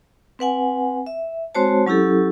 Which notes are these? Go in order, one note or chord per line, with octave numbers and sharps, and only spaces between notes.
C4 B4 F#5 G#5
E5
G#3 C4 F#4 C5 C#5 A5
F#3 C#4 E4 G4 A4